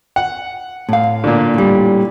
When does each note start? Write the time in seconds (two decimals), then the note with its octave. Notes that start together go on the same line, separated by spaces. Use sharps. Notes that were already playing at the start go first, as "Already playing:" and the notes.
0.16 F#5
0.89 A2 F5
1.24 A#2 D3
1.54 A2 G3